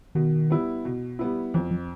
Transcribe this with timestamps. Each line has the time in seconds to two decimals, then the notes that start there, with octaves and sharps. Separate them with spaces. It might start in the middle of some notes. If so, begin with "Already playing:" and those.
0.15 B2 D#3
0.50 G3 B3 E4
0.85 B2
1.19 G3 B3 E4
1.54 F2 E3
1.71 F3